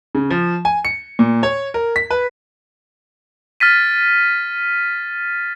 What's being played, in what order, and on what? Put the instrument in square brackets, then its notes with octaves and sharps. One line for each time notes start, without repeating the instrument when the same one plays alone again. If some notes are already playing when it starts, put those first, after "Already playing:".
[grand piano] C#3
F3
G#5
C#7
A#2
C#5
A#4
B6
B4
[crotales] F6 A6 B6 D#7